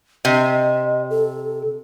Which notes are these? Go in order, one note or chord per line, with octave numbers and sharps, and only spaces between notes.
C3 D#5
A4